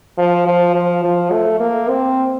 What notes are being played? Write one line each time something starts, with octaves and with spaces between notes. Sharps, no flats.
F3
F3
F3
F3
A3
A#3
C4